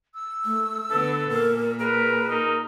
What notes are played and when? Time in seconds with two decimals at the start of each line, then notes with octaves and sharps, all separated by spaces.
0.14 E6
0.45 A3
0.91 D3 B3 A4 B4
1.30 A#2 A#4
1.80 G#4 A#4 B4
2.30 D#4 A#4